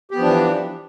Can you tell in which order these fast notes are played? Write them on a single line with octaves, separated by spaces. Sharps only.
G4 B3 F3 D4 E3